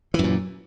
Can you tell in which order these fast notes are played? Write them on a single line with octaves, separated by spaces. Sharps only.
E3 F#2 A#2